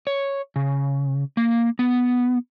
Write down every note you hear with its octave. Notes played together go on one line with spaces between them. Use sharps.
C#5
C#3
A#3
B3